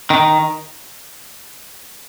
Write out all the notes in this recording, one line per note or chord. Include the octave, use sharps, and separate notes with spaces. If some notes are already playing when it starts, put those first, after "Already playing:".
D#3